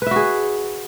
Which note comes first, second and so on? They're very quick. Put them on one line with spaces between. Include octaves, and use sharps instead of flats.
B4 E5 F#4 G#4